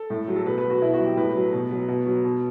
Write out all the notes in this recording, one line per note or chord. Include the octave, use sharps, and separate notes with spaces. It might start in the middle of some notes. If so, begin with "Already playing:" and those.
Already playing: A4
A2
F#3
A4
B2 B4
B4
F#3
F#4
B2 E4
F#4
F#3
G4
A2 B4
F#3
B2
F#3
B2
F#3
B2